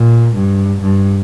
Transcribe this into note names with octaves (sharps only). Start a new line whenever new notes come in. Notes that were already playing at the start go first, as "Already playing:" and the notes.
Already playing: A#2
G2
G2